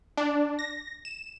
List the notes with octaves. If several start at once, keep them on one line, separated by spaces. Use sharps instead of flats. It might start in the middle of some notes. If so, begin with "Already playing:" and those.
D4
A#6
E7